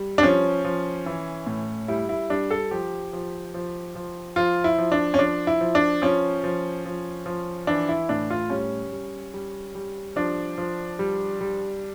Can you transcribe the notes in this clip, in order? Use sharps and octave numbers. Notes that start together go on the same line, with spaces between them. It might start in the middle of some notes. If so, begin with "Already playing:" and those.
Already playing: G3
D4
F3 C#4
F3
E3
A2
G3 E4
E4
G3 D4
A4
F3 G4
F3
F3
F3
F3 F4
E4
F3
D4
C#4
F3 D4
E4
F3
D4
F3 C#4
F3
F3
F3
E3 D4
E4
A2 D4
F4
G3 C#4
G3
G3
G3
F3 D4
F3
G3
G3